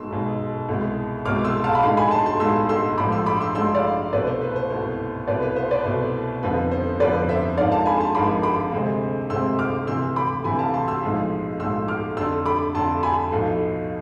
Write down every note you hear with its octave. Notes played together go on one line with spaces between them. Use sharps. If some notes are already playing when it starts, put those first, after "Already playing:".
Already playing: B1 B2 G#3 C6 E6
B1 B2 G#3
C2 B2 G#3
C2 B2 G#3 D6 F6
C6 E6
F5 A5
B5
B1 A2 G#3 D4 F5 A5
G#5 B5
A5 C6
A5 C6
B1 A2 G#3 D4 C6 E6
C6 E6
A1 A2 F3 G#3 D4 B5 D6
C6 E6
B5 D6
C6 E6
A1 A2 F3 G#3 D4 C6 E6
D5 F5
C2 B2 A3 B4 D5
C5
B4
C5
C2 B2 A3
C2 B2 A3 B4 D5
B4
C5 E5
B4 D5
C2 B2 A3 C5
F1 F2 D3 F3 B3 B4
C5
F1 F2 D3 F3 B3 B4 D5
C5 E5
G#1 G#2 F3 G#3 D4 D5 F5
F5 A5
G#5 B5
A5 C6
G#1 G#2 F3 G#3 D4 B5 D6
B5 D6
D2 C3 G#3 C4
D2 C3 G#3 C4 C6 E6
D6 F6
D2 C3 E3 C6 E6
B5 D6
D2 C3 E3 G#5 B5
F5 A5
A5 C6
C6 E6
B1 A2 F3 G#3
B1 A2 F3 G#3 C6 E6
D6 F6
F2 D3 A3 D4 C6 E6
B5 D6
F2 D3 A3 D4 A5 C6
G#5 B5
B1 A2 F3 A3